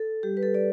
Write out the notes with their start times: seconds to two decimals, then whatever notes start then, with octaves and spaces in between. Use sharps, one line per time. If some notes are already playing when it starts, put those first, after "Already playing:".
Already playing: A4
0.23 G3 G4
0.37 B4
0.43 A4
0.54 D5